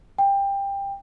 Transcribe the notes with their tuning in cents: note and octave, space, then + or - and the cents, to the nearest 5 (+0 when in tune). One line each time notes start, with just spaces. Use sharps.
G5 +20